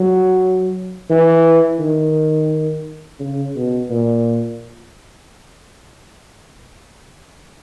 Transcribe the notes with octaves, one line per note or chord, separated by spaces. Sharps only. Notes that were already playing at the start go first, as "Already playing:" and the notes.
Already playing: F#3
E3
D#3
C#3
B2
A#2